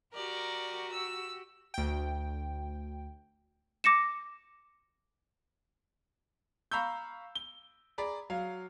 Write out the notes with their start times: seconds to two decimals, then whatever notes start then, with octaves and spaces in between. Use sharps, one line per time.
0.13 F#4 G4 A#4 D5
0.92 E6
1.74 D2 G5
3.84 D6 A#6 C#7 E7
6.71 F5 A#5 B5 C#6 E6 G6
7.35 G7
7.98 G#4 D5 A#5 B5
8.30 F#3 F5